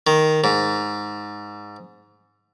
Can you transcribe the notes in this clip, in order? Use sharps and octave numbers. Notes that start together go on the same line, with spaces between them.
D#3
G#2